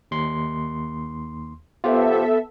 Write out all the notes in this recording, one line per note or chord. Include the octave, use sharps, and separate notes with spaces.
D#2 C6
B3 F4 G4 A4 C5 E5